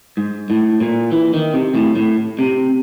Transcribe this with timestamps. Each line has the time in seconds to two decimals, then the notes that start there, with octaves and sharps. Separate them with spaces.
0.17 G#2
0.50 A2
0.81 A#2
1.12 E3
1.34 D#3
1.54 C3
1.75 A2
1.96 A2
2.39 C3